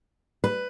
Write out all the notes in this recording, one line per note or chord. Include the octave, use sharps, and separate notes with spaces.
B4